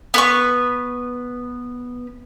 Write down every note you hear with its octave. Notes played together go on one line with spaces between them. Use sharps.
B3 B4 C#6